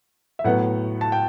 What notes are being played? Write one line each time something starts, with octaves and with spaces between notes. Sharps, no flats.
E5
A2 F#3 B3 F#5
A5
G5